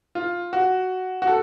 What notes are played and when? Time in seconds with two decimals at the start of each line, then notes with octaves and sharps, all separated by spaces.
0.15 F4
0.53 F#4
1.22 F#4
1.27 A4